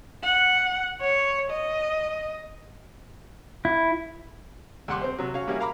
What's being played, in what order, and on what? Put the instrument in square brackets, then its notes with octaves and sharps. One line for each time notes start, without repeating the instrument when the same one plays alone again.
[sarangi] F#5
C#5
D#5
[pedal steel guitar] E4
[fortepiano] D#2 G3 F#5 C6 D6
C4 C5
C3 F#3
C#4 F#4 F5
G3 A#3 C#4 E4 F#4 G#4
A#4 F5 A#5 B5 D6